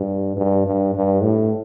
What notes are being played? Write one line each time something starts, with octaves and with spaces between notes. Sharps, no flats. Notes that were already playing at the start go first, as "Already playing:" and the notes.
Already playing: G2
G2
G2
G2
A2